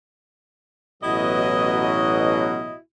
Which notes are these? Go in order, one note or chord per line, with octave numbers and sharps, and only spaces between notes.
A1 B2 F#3 E4 F#4 D#5